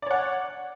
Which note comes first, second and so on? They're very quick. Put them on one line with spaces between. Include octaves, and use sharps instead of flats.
D5 C#5 F#5